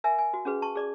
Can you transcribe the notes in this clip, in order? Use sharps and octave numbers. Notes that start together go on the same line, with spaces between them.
A#4 E5 G#5
G#5
F#4
C#4 F#4 G#4 B4
A5 C#6
G#4 D5 D6